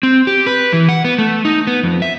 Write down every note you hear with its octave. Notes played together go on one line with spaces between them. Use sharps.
C4
G4
B4
E3
F#5
B3
A3
D#4
B3
F2
E5